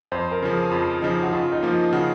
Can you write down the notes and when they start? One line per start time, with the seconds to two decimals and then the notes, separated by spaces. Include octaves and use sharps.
0.12 F2 C5
0.31 A#4
0.42 C#3 F3
0.52 G#4
0.71 F2 F4
1.02 C#3 F3 D#4
1.23 F#4
1.32 C#3 F4
1.52 D#4
1.63 F3 A#3
1.73 F4
1.93 C#3 F#4